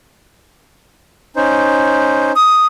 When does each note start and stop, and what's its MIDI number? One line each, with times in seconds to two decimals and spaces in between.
1.36 2.32 61
1.36 2.32 63
1.36 2.32 72
2.36 2.67 87